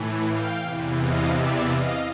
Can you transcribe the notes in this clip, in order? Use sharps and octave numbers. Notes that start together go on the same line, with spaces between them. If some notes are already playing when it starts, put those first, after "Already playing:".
Already playing: A2 E3
F5 G5
E2 C3 E3
D#5 F5
D5 E5
D#5 F5